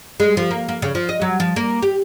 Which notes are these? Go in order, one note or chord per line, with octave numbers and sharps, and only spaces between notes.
G#3
F3
A#3
A#3
C#3
F3
D#5
F#3
F3
A#3
G4